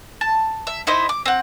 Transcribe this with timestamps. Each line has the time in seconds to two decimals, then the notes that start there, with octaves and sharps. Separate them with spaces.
0.21 A5
0.67 E5
0.87 D#4 E4 C5 D#5
1.09 D6
1.26 C4 F#5